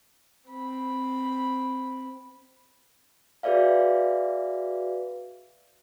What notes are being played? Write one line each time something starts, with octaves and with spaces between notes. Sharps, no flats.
C4 B5
F#4 G#4 B4 D5 E5 F5